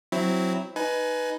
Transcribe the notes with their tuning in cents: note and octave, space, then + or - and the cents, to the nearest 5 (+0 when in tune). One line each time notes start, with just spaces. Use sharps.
F#3 +0 C4 +0 E4 +0
D#4 +0 B4 +0 G#5 +25